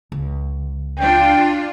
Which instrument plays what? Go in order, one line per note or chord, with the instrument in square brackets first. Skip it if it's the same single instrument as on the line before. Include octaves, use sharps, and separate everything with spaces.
[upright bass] C#2
[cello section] D4 F4 [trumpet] G5